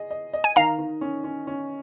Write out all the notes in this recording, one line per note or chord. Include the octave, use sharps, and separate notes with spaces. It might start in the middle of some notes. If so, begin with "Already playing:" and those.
Already playing: G#4 D#5
D#5
D#5
G#5
D#3 F5 A#5
D#3
C#4
C#4
C#4